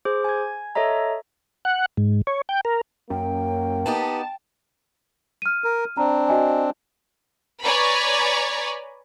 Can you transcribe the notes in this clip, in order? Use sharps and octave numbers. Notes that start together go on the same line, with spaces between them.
G#4 C5 D6
G#5 G#6
A4 C#5 D#5 E5 A#5
F#5
G#2
C#5
G5
A#4
F#2 A#3 G5
B3 D#4 G4 A5
F6 D#7
A#4
C4 D4 A#5
F#4 D#5 G#5
B4 C#5 D5 G#5 A#5 B5